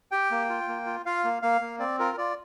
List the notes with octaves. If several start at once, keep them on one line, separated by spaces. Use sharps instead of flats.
G4 G5
A#3
F4
A#3
F4
F4 F5
A#3
A#3 F5
A#3
C4 D5
F4 A#4
F4 D5